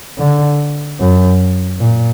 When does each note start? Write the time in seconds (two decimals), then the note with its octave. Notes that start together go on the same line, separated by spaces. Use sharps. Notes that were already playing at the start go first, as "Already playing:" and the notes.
0.18 D3
1.00 F#2
1.80 A#2